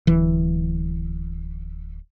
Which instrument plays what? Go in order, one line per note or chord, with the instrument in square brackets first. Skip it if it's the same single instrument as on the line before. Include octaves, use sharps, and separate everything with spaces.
[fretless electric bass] D1 E3